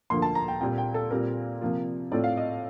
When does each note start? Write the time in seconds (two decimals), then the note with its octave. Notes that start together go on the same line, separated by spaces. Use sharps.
0.10 D2 D3 F3 A#3 C6
0.22 A5
0.35 A#5
0.48 G5
0.61 A#2 G3 C4 F4 G5
0.78 G5
0.94 A4
1.11 A#2 G3 C4 F4 A#4
1.61 C3 F3 A#3 F4
2.11 A2 A3 C4 F4 D5
2.24 F5
2.37 D#5